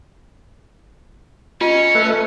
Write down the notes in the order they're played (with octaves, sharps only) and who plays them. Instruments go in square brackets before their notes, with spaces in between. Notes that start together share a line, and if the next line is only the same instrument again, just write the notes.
[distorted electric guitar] C#4 [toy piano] F4 [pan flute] D#5
[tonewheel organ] A3 A4 B4